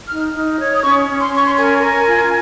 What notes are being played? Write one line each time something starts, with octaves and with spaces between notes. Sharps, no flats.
D#4 F6
D#4
C#5
D#6
C#4 C#6
C#4
C6
C#4 C#6
C6
A#4 G#5
A#4
F4